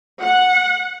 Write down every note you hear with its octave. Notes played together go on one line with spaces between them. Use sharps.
F#5